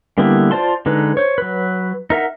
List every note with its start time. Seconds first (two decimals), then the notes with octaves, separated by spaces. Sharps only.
0.18 D3 G3 A#3 B3 E4
0.51 F4 C5 D5 A5 C6
0.86 D3 G#3 D#4 B4
1.17 C5 C#5
1.38 F#3 B4
2.10 D#4 A#4 E5 F#5